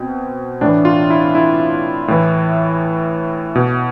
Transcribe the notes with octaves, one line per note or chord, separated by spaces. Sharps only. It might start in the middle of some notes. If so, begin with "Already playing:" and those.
Already playing: B2 C4
A2 E3 D4
F4
E4
E4
A2 E3
B2